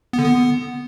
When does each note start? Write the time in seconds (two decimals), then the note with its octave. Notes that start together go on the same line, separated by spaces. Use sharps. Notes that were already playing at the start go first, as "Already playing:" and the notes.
0.13 B3
0.19 D3
0.24 B3